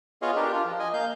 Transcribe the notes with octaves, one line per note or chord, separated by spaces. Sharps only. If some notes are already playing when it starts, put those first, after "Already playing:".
B3 F4 G#4 C#5 D#5 F5
D4 G4 A#4
F4
F3
D#5 G#5
A#3 F5 G6